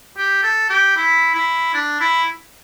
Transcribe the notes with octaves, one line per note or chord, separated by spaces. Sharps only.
G4
A4
G4
E4
E4
D4
E4